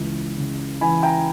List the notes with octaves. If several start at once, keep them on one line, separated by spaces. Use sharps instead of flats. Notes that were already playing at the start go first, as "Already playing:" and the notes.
Already playing: C#2 C#3 E3
C#3
E3 G#5 B5
G5 A#5